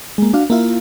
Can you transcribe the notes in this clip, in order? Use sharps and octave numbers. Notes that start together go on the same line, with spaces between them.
G#3 A#3
D4 F#4 F5
A#3 E4 F4